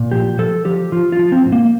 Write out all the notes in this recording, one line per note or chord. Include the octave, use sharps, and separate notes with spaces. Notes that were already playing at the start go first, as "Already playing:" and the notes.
Already playing: A#2
F3 G4
F3 A4
F3 G4
F3 F4
F4
F3
C4
A2
A#3